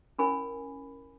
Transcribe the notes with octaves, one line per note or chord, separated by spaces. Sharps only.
C#4 E4 A#4 C#5 G#5 B5